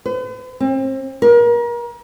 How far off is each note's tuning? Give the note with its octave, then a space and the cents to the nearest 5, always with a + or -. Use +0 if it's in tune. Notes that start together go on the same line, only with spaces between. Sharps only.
B4 +45
C4 +35
A#4 +35